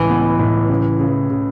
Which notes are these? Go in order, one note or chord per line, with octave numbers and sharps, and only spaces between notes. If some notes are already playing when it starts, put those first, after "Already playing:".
Already playing: C#2 A2 E3
B3
A2
C#3
C#3
C#3